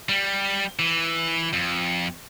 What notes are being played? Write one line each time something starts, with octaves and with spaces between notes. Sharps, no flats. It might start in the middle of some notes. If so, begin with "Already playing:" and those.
G3
E3
F2